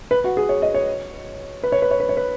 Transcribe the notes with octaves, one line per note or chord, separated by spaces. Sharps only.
B4
F#4
G#4
C#5
D#5
C#5
B4
C#5
B4
C#5
B4
C#5
B4